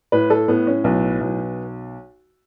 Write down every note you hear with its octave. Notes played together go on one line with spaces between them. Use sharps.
A2 B4
A4
A2 B3
C#4
B1 B3
B1